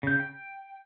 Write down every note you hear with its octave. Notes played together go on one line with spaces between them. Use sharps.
C#3 G6
G5